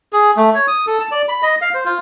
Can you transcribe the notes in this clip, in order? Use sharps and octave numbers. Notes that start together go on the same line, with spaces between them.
G#4
A3
C#5
D#6
A4
A5
D5
B5
D#5
F5
C5
F4